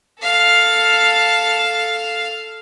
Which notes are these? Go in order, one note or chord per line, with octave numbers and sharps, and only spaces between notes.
A4 F5